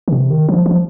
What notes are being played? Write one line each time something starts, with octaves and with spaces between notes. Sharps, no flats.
D#3
C3
D#3
F3
F3